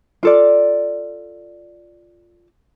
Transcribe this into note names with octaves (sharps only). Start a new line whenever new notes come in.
F4 A4 D5